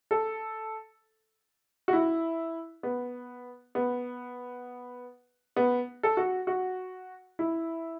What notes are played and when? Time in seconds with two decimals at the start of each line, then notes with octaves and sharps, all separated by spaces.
0.11 A4
1.88 F#4
1.93 E4
2.83 B3
3.75 B3
5.56 B3
6.03 A4
6.17 F#4
6.47 F#4
7.39 E4